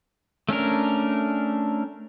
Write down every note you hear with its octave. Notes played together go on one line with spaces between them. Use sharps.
A3 C#4 D4 A#4